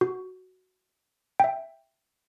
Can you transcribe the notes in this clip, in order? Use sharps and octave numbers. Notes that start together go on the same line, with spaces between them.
F#4
E5 G5